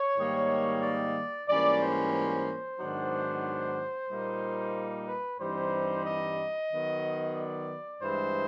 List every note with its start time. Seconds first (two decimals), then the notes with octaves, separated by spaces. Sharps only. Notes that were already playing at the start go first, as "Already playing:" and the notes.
Already playing: C#5
0.18 G#2 D#3 G3 A#3 D#4
0.83 D5
1.48 G#2 E3 G3 A#3 C#4 D5
1.81 C5
2.13 C5
2.79 G#2 D#3 F#3 B3 D4
4.09 A#2 G3 A#3 D#4
5.07 B4
5.40 G2 E3 G3 C4 D#4 C5
6.05 D#5
6.70 D#3 F#3 B3
7.36 D5
8.01 G2 E3 G#3 C5